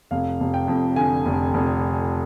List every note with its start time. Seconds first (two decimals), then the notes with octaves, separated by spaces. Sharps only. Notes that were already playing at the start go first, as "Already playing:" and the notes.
0.11 F1 F5
0.40 F1
0.54 G5
0.68 F2
0.96 D3 G#5
1.26 F1
1.54 F1